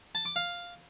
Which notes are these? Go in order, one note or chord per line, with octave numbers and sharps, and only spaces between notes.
A5
D6
F5